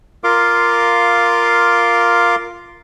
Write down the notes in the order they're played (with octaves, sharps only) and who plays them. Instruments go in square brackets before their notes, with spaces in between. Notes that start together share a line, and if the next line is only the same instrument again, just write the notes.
[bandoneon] F4 A#4 F5 C6 D6